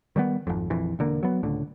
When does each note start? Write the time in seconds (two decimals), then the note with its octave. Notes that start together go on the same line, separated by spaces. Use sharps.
0.16 D#3 G3 G#3 B3
0.47 G#1 F2
0.70 A#1 F2 E3
0.99 E1 D3 A#3
1.23 F#3 B3
1.43 C#2 A2 D3